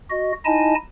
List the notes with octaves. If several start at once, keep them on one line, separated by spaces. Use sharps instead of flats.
F#4 D#5
D#4 E4 D#5 G#5 A5